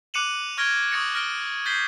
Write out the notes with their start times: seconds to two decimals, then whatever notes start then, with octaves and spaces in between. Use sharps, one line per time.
0.14 D6 F#6 C#7 D#7 E7 F#7
0.57 C#6 F6 G#6 A#6 D7 G7
0.92 C#6 D#6 A6 A#6 C#7
1.15 F6 A6 A#6 D7 G7
1.66 G6 A6 B6 C7 G7